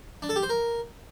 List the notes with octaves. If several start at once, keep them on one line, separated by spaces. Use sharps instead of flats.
D4
A4
G4
C5
A#4